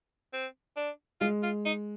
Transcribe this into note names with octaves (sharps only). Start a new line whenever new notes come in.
C4
D4
G#3 F4
F4
D#4